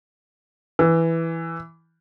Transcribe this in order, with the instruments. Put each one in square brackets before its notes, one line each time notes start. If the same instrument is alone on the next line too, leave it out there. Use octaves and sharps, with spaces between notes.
[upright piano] E3